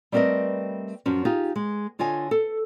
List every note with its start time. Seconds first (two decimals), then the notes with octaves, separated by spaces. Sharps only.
0.12 G3 A3 C4 A#4 B4 D#5
1.06 F#2 F3 C#4
1.25 D#4 F4 G4 G#4
1.56 G#3
1.99 D3 F4 C#5 D#5 G#5
2.31 A4